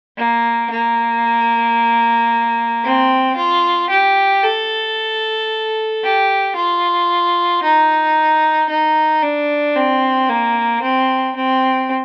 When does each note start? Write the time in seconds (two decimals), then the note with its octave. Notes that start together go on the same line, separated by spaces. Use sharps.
0.17 A#3
0.70 A#3
2.84 C4
3.36 F4
3.90 G4
4.43 A4
6.03 G4
6.56 F4
7.63 D#4
8.69 D#4
9.22 D4
9.76 C4
10.29 A#3
10.82 C4
11.36 C4